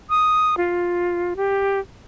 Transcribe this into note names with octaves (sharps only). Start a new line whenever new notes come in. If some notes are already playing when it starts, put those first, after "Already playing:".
D#6
F4
G4